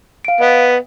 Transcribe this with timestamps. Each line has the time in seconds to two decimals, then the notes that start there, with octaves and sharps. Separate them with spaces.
0.25 F5 D7
0.41 B3 D#5 G5